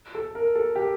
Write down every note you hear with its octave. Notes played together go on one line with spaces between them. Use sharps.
A4
A#4
A4
G4